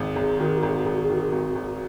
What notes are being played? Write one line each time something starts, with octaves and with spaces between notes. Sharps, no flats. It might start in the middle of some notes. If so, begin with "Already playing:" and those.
Already playing: G#1 G#2
G#1 G#4
D#3 F#4
G#4
F#4
G#1 G#4
F#4
G#1 G#4
F#4
G#4
D#3 F#4
G#4
G#1 F#4
G#1